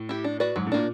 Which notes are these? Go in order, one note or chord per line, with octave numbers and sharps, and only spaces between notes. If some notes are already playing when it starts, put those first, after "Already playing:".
Already playing: A2
E4 G4
D4
F#4 B4 D5
G#2 F#3
A2
A#2 A#3 D4